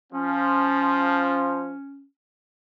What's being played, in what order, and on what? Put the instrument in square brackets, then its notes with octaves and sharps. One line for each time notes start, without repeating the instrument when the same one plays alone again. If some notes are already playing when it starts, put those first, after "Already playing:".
[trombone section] F3 [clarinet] C#4